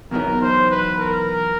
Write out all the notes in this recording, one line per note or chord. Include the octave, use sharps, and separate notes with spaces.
E2 B2 F#3 B3 D#4 A#4
C5
B4
A#4